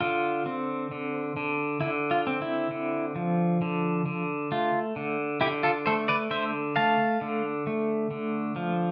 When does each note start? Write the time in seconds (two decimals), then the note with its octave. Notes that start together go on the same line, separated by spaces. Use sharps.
0.01 D3 F4
0.46 C4
0.91 D3
1.36 D3
1.81 D3 E4
2.11 F4
2.27 C4
2.42 E4
2.71 D3
3.16 F3
3.62 D3
4.06 D3
4.52 A3 F4
4.96 D3
5.41 D3 E4 G4
5.63 F4 A4
5.86 A3 A4 C5
6.08 B4 D5
6.31 D3 C5 E5
6.76 A3 F5 A5
7.21 D3
7.67 A3
8.11 D3
8.56 F3